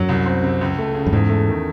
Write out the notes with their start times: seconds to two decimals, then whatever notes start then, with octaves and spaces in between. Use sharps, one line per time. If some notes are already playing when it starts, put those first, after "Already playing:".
Already playing: F#2 F#3
0.09 C2
0.26 C4
0.43 C3
0.61 C#2
0.78 A3
0.95 C#3
1.07 F#2
1.13 E2 G#2
1.29 A3
1.47 D#3